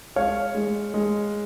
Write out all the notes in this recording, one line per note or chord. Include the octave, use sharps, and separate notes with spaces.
G#3 C#5 F5
G#3
G#3